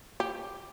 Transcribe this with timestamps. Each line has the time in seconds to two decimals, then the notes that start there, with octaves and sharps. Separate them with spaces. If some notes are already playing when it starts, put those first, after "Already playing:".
0.20 G4